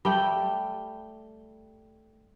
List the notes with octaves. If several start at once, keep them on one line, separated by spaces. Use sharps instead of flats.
G3 A3 G5